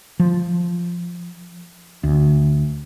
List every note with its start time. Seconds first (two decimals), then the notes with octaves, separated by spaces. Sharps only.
0.20 F3
2.04 D2